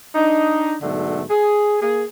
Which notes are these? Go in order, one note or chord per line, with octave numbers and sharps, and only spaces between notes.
D4 D#4
G#2 B2 D3 F#3 A3
G#4
A#3 G#4